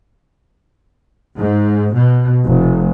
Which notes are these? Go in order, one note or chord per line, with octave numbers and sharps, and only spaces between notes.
G#2
B2
F1